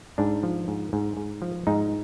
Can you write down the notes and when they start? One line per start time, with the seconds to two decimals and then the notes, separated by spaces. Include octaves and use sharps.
0.18 G#2 D4
0.43 F3
0.68 G#2
0.93 G#2
1.17 G#2
1.42 F3
1.67 G#2 D#4